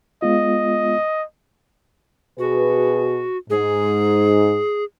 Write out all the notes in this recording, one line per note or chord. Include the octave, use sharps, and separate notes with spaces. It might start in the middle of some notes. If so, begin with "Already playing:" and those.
G#3 B3 F4 D#5
B2 F#4 G#4 B4
G#2 G#4